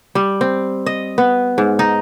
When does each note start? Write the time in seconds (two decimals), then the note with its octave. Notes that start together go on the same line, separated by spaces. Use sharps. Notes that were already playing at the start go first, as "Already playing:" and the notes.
0.15 G3
0.41 C4
0.86 D#5
1.18 B3
1.58 G#2
1.79 D#4